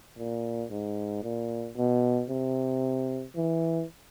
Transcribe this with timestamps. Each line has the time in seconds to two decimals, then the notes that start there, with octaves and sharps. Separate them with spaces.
0.18 A#2
0.70 G#2
1.23 A#2
1.77 B2
2.30 C3
3.36 E3